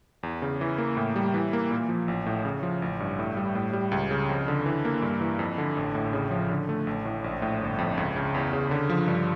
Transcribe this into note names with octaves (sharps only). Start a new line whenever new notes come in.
E2
C#3
E3
A#3
A2
G3
E3
A#3
A#2
F3
A1
A2
C#3
F3
A1
G2
A2
G3
A2
G3
C#2
C#3
F2
D3
E3
A#3
G2
E3
F2
D3
A1
A2
C#3
F3
D3
A3
A1
A2
A#1
A2
G1
F2
C#2
C#3
E2
C#3
D3
F3
G2